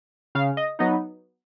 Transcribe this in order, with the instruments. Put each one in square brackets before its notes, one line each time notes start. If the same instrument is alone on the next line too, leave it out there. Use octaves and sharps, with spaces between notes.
[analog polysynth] C#3 F5
D#5
F#3 B3 D#4 D#5